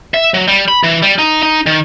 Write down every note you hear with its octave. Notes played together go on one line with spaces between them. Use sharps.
E5
F#3
G3
B5
E3
G3
D#4
D#4
D#3